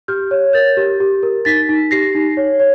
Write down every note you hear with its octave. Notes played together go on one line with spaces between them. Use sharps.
G4 F6 G6
C#5
A#4 G6 A6
G4
G4
A#4
D#4 A6 B6
D#4
G4 A#6 C7
D#4
C#5
C#5